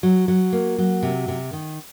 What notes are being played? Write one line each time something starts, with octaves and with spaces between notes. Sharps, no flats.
F#3
F#3
A#3
F#3
C3
C3
D#3